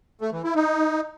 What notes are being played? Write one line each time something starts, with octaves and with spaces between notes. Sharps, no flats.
A3
E3
E4
D#4